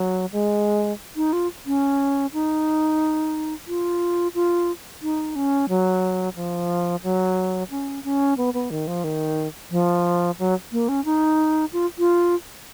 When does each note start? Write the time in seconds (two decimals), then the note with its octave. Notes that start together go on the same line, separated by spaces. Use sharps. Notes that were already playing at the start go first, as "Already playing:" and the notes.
Already playing: F#3
0.32 G#3
1.16 D#4
1.33 F4
1.66 C#4
2.33 D#4
3.68 F4
4.35 F4
5.02 D#4
5.36 C#4
5.69 F#3
6.36 F3
7.03 F#3
7.70 C#4
8.04 C#4
8.38 B3
8.54 B3
8.71 D#3
8.87 F3
9.04 D#3
9.71 F3
10.39 F#3
10.72 A#3
10.89 C#4
11.05 D#4
11.73 F4
11.99 F4